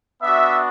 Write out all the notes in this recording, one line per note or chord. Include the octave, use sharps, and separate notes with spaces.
B3 D4 F#4 E5